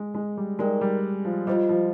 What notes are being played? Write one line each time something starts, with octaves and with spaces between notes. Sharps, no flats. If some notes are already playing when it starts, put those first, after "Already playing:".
Already playing: G#3
G#3
G3
G#3 D#4 A#4 D5 G5
G3
F3
G3 F4 C5 D#5
F3